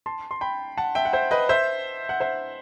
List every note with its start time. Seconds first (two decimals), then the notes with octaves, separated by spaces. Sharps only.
0.06 A5 C6
0.31 C6
0.41 G5 B5
0.77 F#5 A5
0.95 E5 G5
1.05 F#5
1.13 C5 E5
1.31 B4 D#5
1.49 C5 E5
2.09 F#5
2.20 C5 E5